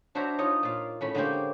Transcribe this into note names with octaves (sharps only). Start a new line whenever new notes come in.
D4 F#4 C5 C#5 E5 A#5
D#4 F4 C#5 D#5
A#2 F5
A2 C#4 B5
D3 G#3 A#3 C#4 G4 C5